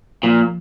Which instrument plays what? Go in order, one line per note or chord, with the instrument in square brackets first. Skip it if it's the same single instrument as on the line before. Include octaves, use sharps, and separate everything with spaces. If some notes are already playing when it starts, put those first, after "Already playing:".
[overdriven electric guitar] A#2 [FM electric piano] F3